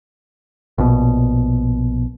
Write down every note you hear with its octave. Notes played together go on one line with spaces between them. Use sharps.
A#1 B2